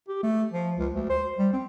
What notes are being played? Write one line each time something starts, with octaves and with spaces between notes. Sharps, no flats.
G4
A3
F3
C#2
D2
C5
G3
C4